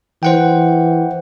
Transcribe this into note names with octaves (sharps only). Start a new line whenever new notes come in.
E3 C5 F#5 G5